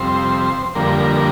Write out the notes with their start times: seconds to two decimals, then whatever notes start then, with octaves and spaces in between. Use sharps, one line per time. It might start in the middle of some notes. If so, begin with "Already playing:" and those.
Already playing: F2 C3 G3 C4 C5
0.75 F2 D3 G3 A#3 A#4